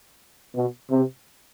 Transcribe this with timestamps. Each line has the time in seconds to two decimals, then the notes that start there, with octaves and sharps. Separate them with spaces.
0.55 B2
0.91 C3